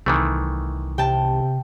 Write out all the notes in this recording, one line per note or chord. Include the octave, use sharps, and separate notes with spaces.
C2 D#3 E3 A3
C3 G5 A5